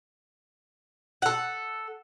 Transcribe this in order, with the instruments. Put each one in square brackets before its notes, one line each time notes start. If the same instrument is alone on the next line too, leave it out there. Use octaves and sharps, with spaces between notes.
[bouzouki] A4 F#5